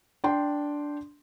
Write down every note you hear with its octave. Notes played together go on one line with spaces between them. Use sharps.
D4 G5 C6